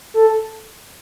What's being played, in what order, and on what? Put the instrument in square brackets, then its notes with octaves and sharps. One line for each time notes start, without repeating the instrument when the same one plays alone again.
[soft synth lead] A4